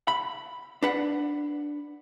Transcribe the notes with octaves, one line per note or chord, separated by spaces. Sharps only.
B5
D4 B4 F#5